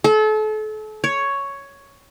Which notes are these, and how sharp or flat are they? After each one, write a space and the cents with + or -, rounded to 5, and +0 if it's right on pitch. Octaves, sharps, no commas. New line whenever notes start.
A4 -35
C#5 +5